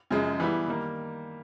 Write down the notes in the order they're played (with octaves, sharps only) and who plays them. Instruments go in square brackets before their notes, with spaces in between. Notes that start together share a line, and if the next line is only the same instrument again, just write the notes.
[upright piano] F#2 C#3 F3 G#3
E3 G3 B3 E4
D#3 G3 A#3